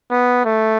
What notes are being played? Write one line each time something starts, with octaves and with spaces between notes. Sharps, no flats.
B3
A3